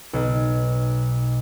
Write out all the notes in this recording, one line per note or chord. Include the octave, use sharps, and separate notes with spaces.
B1